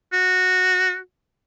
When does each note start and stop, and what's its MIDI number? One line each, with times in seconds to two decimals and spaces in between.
0.13 0.97 66